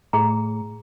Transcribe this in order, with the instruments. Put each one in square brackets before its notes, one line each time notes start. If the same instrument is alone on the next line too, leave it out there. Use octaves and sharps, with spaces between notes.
[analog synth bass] A2 [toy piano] G#4 A#5